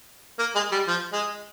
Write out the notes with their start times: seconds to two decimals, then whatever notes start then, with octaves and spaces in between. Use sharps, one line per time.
0.39 A#3
0.55 G#3
0.72 G3
0.88 F3
1.12 G#3